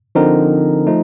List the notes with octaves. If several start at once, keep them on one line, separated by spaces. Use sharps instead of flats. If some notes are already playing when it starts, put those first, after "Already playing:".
D3 F3 C4 D#4 A#4
F3 A3 D#4